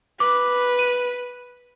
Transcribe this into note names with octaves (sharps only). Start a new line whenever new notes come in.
B4 D6
D#7